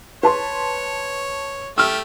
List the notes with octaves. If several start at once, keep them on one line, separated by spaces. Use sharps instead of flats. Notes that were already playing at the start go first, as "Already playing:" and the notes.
B4 C#5 A5 C6
A3 G4 E6 F6